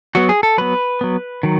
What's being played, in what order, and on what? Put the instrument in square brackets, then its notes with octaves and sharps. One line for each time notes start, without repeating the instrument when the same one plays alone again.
[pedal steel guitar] F#3 B3 F#4
G#4
A4
F#3 B3 B4
F#3 B3
D#3 F#3